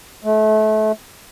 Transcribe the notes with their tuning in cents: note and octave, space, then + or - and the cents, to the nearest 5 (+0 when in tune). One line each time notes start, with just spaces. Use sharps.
A3 -30